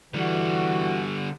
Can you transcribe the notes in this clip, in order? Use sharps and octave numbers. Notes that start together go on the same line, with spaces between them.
D3 E3 G3 F#4